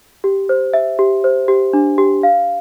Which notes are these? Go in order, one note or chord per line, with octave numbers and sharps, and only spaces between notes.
G4
C5
E5
G4
C5
G4
D4
G4
F5